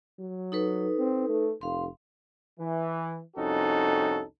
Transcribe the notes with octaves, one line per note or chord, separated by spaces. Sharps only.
F#3
D#4 A4 B4
C4
A3
F1 F5 C6
E3
C2 F2 C#4 D#4 F#4 A4